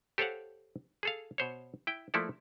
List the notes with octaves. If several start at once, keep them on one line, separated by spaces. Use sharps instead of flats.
G4 A4 C5 C#5 F5 F#5
G#4 A4 F5
B2 C5 C#5
E4 G5
F3 A3 A#3 E4 A4 D5